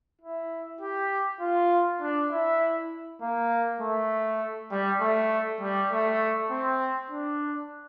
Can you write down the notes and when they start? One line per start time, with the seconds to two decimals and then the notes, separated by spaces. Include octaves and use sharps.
0.21 E4
0.81 G4
1.40 F4
2.01 D4
2.30 E4
3.21 A#3
3.81 A3
4.71 G3
5.00 A3
5.61 G3
5.91 A3
6.51 C4
7.10 D4